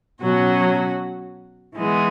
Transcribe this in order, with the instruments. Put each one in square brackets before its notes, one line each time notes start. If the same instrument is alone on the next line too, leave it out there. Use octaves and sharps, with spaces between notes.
[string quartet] B2 F#3 C#4 F#4
E3 G#3 B3